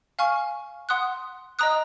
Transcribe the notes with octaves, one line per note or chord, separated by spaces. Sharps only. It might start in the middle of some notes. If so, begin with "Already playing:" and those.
F5 G#5 C#6 F6
F#5 C6 D#6 F#6
D#5 A#5 D#6 F#6